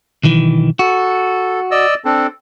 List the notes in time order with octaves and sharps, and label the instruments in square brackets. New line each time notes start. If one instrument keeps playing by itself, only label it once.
[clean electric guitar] B1 D#3 E3
[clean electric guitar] F#4 [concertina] A4
[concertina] D5 D#5 E6
C4 D4 A4